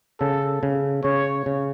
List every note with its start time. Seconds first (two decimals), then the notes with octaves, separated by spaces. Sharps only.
0.20 C#3 A4
0.63 C#3
1.04 C#3 C#5
1.46 C#3